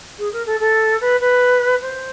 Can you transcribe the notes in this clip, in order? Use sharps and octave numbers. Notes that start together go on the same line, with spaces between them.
G#4
A#4
A4
A4
B4
B4
C5